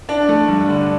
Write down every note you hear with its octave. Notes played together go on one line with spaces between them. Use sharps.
D4 D5
A3
G2
D3